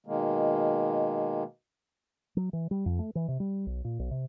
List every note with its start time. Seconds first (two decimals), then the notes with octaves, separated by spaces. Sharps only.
0.07 B2 D#3 G#3 A#3
2.37 F#3
2.53 E3
2.71 G3
2.86 F2
2.99 A3
3.15 E3
3.28 C3
3.40 G3
3.66 B1
3.85 A#2
3.99 B1
4.11 C3